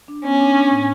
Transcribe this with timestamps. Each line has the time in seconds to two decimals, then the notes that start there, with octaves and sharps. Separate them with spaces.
0.08 D4
0.24 B3 C#4
0.40 D4
0.56 D4
0.71 A2